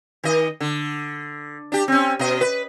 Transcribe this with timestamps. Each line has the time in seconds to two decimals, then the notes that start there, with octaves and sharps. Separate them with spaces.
0.24 D#3 D#5
0.60 D3
1.72 D4 G4
1.88 C4 C#4
2.19 B2 D#5
2.41 B4